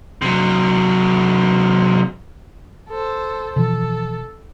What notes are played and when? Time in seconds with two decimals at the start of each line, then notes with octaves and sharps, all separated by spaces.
0.22 C3 F#3
2.89 A4 C5
3.56 B2 E3 F3 A4